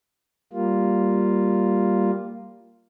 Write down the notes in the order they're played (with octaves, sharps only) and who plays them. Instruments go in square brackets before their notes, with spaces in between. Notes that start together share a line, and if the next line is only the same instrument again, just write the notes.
[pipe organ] G3 A#3 F4